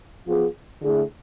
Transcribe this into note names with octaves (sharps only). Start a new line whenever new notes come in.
F3 B3 F4 G#4
D3 A3 E4 G#4